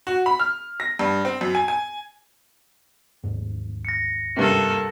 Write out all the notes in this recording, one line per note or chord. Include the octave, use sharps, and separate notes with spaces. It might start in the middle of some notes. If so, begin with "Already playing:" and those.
F#4
B5
F6
A#6
G2
C4
F#2
G#5
G#5
D1 D#2 G#2
A#6 C#7
G2 C3 A#3 A4